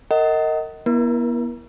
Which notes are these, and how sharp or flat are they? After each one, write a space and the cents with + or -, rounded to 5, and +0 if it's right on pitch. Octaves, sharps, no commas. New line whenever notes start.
A#4 -30 D#5 +20 F#5 +25
B3 -40 E4 +0 A#4 +30